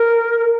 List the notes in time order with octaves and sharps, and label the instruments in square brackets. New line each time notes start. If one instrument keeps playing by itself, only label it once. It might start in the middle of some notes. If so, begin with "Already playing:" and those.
Already playing: [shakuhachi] A#4